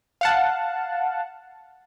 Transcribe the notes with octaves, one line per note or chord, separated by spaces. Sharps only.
F5 F#5 A5